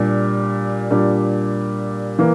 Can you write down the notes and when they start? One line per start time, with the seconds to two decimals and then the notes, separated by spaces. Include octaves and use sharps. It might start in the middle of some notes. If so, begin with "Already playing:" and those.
Already playing: A#2 G3 D4 G4
0.91 A#2 G3 D4
2.19 E3 A#3